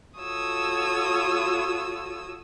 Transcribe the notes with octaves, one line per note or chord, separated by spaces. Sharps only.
F4 F#4 A4 C#5 D#6 E6